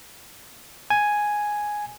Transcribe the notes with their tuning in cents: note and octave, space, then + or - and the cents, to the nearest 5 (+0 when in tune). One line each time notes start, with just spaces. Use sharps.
G#5 +0